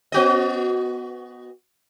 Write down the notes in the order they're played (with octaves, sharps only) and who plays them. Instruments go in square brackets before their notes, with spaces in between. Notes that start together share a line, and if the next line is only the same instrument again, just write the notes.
[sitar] B3 F#4 D#5